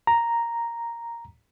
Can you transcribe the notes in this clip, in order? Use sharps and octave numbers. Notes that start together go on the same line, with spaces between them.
A#5